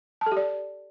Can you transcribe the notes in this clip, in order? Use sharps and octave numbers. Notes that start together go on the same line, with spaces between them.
A5
A4
G4
D5